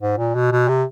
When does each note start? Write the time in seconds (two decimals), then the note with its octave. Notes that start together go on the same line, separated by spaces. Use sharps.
0.01 G#2
0.18 A#2
0.35 B2
0.52 B2
0.68 C3